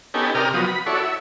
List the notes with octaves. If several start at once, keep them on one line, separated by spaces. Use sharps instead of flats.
B3 C#4 D#4 G4 A4 G#5
C3 G4 A#4 D5 D#6 F6
F3 F#3 B3 D#6
B5
E4 F#4 A4 C#5 D5
E5